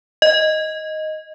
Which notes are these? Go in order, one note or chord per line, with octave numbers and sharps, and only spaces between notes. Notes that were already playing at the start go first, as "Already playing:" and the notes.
D#5